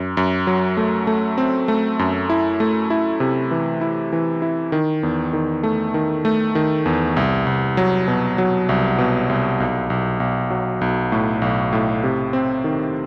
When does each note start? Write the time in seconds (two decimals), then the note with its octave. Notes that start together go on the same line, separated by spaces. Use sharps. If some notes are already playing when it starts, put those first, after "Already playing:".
Already playing: F#2
0.17 F#2
0.47 F#3
0.77 A3
1.07 A3
1.38 C4
1.68 A3
1.99 F#2
2.30 E4
2.60 A3
2.90 E4
3.20 C3
3.51 E3
3.81 E4
4.13 E3
4.42 E4
4.72 D#3
5.03 E2
5.33 D#3
5.63 A3
5.94 D#3
6.25 A3
6.55 D#3
6.86 E2
7.17 C2
7.47 C2
7.77 F#3
8.08 B2
8.38 F#3
8.69 C2
8.98 B2
9.29 C2
9.60 B1
9.90 B1
10.20 B1
10.50 F#3
10.81 B1
11.12 A2
11.42 B1
11.73 A2
12.03 C3
12.33 C4
12.64 D#3